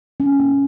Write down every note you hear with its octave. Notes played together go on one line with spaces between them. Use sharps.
C#4
A#3